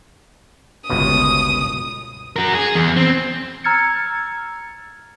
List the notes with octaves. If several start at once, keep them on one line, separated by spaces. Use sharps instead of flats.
G1 C#2 B2 D#6
F#4 A#4
G#4
E2
C4
A#5 E6 F6 G#6 A6 C#7